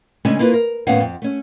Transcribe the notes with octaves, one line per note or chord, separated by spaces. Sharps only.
C#3 G#3 A3 C#4 D4
A#3 E4 F4 B4
A#4
D#2 A2 B3 C#4 F5 F#5
F2
A3 C#4